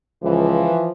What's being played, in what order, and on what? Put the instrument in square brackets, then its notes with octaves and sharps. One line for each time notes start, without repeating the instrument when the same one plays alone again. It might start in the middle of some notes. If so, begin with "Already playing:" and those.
[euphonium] C#2 [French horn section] E3 F3